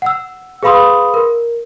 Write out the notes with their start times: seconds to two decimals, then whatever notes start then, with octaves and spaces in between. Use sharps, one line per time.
0.02 F#5 E6
0.63 G#4 B4 F5 B5 C6 D#6
1.14 A#4